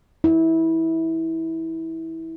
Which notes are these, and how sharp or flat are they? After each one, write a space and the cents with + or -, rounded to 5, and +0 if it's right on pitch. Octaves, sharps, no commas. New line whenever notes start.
E4 -20